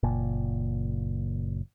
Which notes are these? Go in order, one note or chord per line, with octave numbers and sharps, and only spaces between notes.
F#1 A#2